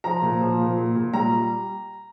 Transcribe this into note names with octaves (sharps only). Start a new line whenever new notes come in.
F3 A#5
A#2
F3
A#2
A#2
A#2
G3 A#5